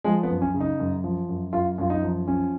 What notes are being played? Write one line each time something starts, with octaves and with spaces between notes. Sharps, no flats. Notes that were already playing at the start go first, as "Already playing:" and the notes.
F3 G#3
B3
F#2
C#4
C#3
D#4
F#2
F3
F#2
F#2 F4
F#2 F4
D#4
F3
F3 C#4